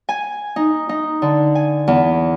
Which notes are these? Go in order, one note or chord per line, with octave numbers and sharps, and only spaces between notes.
G#5
D#4
D#4
D3
G#5
E2